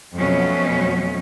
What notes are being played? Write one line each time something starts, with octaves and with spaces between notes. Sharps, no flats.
F2 B2 F3 F#3 A3 C#4